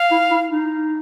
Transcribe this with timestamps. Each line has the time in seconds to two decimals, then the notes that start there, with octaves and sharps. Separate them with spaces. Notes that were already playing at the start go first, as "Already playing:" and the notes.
Already playing: F5
0.11 E4
0.31 E4
0.51 D#4